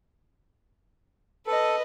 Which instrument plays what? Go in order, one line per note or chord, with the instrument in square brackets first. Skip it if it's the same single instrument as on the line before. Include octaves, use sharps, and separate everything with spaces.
[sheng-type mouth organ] A4 [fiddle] B4 D#5